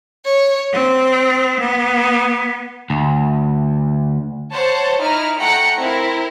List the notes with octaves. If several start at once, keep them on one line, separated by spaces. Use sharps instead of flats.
C#5
C4
B3
D2
C5 C#5 F#5 A5
D#4 E4 A#5 F6
A3 F#5 G5 A#5 C#7
C4 E4 A#4